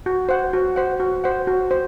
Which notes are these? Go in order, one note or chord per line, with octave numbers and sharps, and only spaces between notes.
F#4
C5 F#5
F#4
C5 F#5
F#4
C5 F#5
F#4
C5